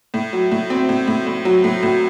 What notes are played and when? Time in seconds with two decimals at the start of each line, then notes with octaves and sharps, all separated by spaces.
0.14 A2
0.33 F#3
0.51 A2
0.70 C4
0.89 A2
1.07 A2
1.27 A2
1.45 F#3
1.64 A2
1.83 A2